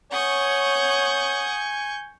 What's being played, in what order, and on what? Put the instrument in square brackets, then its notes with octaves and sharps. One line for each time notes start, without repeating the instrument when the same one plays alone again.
[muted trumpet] C#5 [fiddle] F#5 D#6 [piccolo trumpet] G#5 [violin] C#6 G6